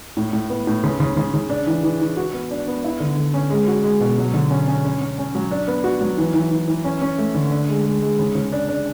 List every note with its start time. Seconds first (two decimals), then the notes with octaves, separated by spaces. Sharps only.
0.17 A2
0.33 A2
0.50 B3
0.67 A2
0.84 C#3
1.00 C#3
1.17 C#3
1.34 C#3
1.50 D4
1.67 E3
1.83 E3
2.01 E3
2.17 F#4
2.34 B3
2.51 D4
2.68 B3
2.84 E4
3.00 D3
3.17 D3
3.34 C#4
3.50 G#3
3.68 F#4
3.84 G#3
4.01 B2
4.18 F#3
4.34 D3
4.51 C#4
4.68 C#4
4.84 C#4
5.01 C#4
5.18 C#4
5.35 F#3
5.51 D4
5.68 B3
5.84 F#4
6.01 F#3
6.18 E3
6.34 E3
6.51 E3
6.68 E3
6.84 C#4
7.02 C#4
7.19 A3
7.34 D3
7.51 D4
7.69 G#3
7.86 G#3
8.02 G#3
8.19 C#3
8.35 C#3
8.52 D4
8.68 D4